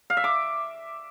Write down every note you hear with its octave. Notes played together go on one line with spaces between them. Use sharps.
F5
E5
D6